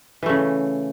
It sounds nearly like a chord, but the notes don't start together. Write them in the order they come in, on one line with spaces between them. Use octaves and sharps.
E3 A3 C#3